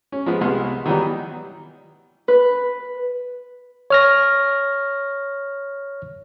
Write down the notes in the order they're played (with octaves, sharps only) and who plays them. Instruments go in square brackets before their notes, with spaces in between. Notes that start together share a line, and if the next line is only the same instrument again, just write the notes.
[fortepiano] C#4
F3 G#3 B3
C2 G#3 B3 C6 F6
D#3 E3 F#3 G3 B3 D#4
[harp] B4
[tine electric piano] C#5 F6 A#6